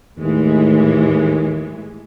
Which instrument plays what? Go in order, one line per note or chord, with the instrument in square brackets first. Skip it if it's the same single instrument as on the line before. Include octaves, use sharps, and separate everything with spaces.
[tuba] D#2 [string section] A2 E3 G#3